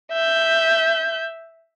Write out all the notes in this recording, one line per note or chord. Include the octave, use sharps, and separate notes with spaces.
E5 G6